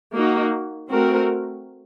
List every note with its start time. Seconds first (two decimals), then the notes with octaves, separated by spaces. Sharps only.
0.13 A#3 D#4 F#4
0.91 A3 C4 F#4 A#4